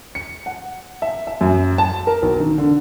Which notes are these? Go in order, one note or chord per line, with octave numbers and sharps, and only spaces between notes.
C#7
F#5
E5
E5
F#2
A5
A#4
B1
D#3
D3